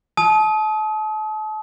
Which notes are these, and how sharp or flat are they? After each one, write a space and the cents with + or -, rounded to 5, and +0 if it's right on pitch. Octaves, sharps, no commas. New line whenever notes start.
A5 -35 D#6 +30